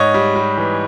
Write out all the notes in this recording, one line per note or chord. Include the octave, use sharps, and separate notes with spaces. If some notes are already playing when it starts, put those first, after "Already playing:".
Already playing: G#2 C#5 D#5
G3
G3
E3